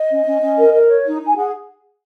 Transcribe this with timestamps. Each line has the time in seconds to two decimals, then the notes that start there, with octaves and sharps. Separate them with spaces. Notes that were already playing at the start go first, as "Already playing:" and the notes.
Already playing: D#5
0.10 C#4
0.24 C#4
0.41 C#4
0.57 A#4
0.72 A#4
0.88 C#5
1.04 D#4
1.20 D#4
1.26 G#5
1.35 G#4 F#5